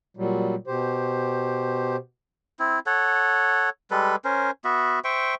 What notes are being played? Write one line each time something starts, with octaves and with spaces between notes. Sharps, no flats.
A#2 F#3 G3
B2 G4 C5
C4 E4
A4 C#5 F#5
G3 G#3 A4 B4
C#4 A#4 C5
B3 F#4 E5
C5 E5 G5 C#6